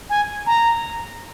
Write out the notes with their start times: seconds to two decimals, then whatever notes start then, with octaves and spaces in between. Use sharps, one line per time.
0.10 G#5
0.46 A#5